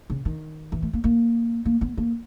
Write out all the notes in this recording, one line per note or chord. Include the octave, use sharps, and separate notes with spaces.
C#3
D#3
E3
A3
A#3
A#3
A#3
B3
A#3